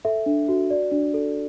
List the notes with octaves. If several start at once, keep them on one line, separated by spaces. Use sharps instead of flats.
A4 E5
D4
F#4
D5
D4
A4